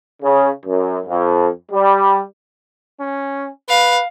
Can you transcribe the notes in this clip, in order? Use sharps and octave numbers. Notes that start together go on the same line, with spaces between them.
C#3
F#2
F2
G3
C#4
B4 F5